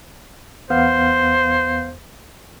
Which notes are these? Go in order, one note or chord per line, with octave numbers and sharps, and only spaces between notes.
E2 B3 C5 F5